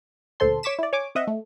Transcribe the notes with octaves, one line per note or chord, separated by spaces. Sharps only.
D2 A#2 A4 C5 A5 C6
C#5 C#6 D6 B6 E7
E4 D5
C#5 G#5 D6
C4 D#5 E5 F#5
A3